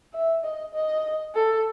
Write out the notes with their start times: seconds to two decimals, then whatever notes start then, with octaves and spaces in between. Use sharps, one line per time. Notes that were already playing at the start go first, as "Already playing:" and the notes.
0.14 E5
0.44 D#5
0.74 D#5
1.35 A4